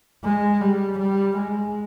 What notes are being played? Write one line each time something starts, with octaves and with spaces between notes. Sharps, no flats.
G#3
G3
G3
G#3